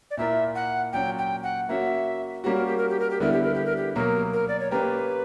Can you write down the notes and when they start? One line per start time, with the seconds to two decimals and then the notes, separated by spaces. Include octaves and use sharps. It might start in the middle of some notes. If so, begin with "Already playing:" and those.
0.11 D5
0.17 A#2 A#3 E4 A#4 E5
0.55 F#5
0.93 A#2 F#3 C#4 G5
1.18 G5
1.43 F#5
1.69 A#3 C#4 F#4 E5
2.44 G3 A#3 C#4 F#4 G4
2.55 A#4
2.66 G4
2.78 A#4
2.89 G4
3.00 A#4
3.11 G4
3.20 D3 G3 B3 E4 A#4
3.32 G4
3.43 A#4
3.54 G4
3.66 A#4
3.77 G4
3.96 B2 F#3 A#3 A#4
4.33 A#4
4.48 D5
4.60 C#5
4.71 A#3 C#4 G4 A#4 B4